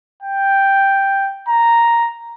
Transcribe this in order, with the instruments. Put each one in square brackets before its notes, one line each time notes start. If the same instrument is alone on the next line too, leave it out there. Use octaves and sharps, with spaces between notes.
[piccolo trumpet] G5
A#5